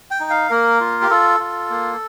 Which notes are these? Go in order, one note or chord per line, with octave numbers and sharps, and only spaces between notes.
G5
D#4
F5
A#3 A#4
F4
G4
F4 A4
F4
A#3